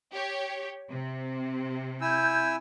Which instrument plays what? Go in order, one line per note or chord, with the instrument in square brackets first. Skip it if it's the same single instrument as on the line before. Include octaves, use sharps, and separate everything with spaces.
[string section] G4 C#5
C3
[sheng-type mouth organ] E4 G#5 E6 [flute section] G6